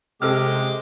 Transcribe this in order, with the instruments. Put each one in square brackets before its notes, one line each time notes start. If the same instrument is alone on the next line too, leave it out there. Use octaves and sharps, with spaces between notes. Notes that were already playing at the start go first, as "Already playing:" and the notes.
[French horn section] C3 [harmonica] G#3 G4 D6 [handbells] A4 E6 F6